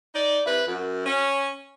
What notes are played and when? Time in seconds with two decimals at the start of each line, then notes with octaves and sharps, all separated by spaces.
0.15 D#4 D5
0.46 C3 E4 B4
0.67 F#2
1.06 C#4